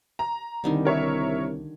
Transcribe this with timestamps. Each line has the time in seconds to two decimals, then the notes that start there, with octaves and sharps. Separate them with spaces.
0.19 A#5
0.64 C2 D3 D#3 G3
0.85 A#4 C#5 E5